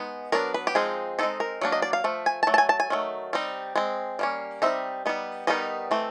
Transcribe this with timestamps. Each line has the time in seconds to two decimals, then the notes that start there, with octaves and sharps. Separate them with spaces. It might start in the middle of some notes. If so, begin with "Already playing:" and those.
Already playing: G#3 B3 D#4
0.32 F#3 B3 D4 A#4
0.54 B4
0.67 G4
0.75 F3 G#3 C4 D#4 G#4
1.19 G#3 C4 D#4 A4
1.40 A#4
1.61 F#3 A#3 D4
1.72 D#5
1.82 D5
1.93 F5
2.04 F3 A3
2.26 G#5
2.43 A5
2.47 F#3 A3
2.54 A5
2.58 G#5
2.69 A5
2.80 G#5
2.90 D#3 F#3 A3
3.33 G3 C4 D#4
3.75 G#3 C4
4.19 G3 A#3 C#4
4.62 G3 C4 D#4 E5
5.06 G3 B3 D#4
5.47 D#3 G3 B3 D#4 D#5
5.91 E3 A3 C4